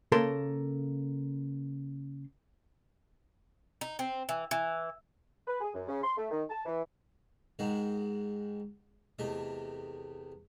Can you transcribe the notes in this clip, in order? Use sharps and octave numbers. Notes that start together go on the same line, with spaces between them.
C#3 A#3 A4 A#4 C6
D#4
C4
E3
E3
B4
G#4
F#2
C#3
C6
A3
D#3
A5
E3
G#2 D#3 G#3 F#4
E2 C3 A3 D#5